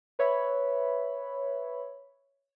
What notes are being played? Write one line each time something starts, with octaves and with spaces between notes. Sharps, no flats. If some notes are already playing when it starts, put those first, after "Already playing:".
B4 C#5 E5 B5